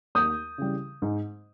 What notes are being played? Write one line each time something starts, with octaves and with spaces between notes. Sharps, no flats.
D#2 D#6 G6
C#3 E3 G3
G#2